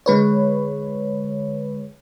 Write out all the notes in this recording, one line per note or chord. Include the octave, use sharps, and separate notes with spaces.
D3 G#3 B4 C#5